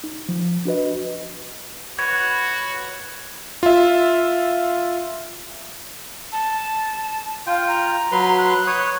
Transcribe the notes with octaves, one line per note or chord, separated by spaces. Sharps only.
D#4
F3
D4 F#4 B4 D#5
F#4 B4 C#5 G#6
F4 E5
A5
F4 F5 G5
A#5
F#3 B4 C6
F#6
C#5 D#6